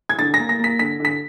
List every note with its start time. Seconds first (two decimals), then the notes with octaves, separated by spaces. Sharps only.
0.09 G#6
0.19 D3 A6
0.34 A#6
0.39 A#3
0.49 A#6
0.59 A#3 B6
0.79 D3 B6
1.00 D3
1.05 B6